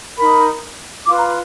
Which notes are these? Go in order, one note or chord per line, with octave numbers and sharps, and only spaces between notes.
D#4 A#4 B5
F4 B4 D6
A#5